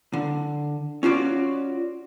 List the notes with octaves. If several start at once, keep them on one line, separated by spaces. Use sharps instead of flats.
D3
C#4 F4 F#4 D5